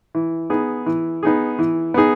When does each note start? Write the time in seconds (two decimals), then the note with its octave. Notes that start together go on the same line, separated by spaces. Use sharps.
0.15 E3
0.50 B3 D#4 G#4
0.86 E3
1.23 B3 D#4 G#4
1.59 E3
1.94 B3 D#4 G#4